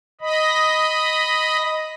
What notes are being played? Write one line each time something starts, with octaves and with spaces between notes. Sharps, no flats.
D#5 B5